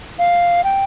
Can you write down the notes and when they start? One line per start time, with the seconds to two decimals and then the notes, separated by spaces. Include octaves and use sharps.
0.19 F5
0.64 G5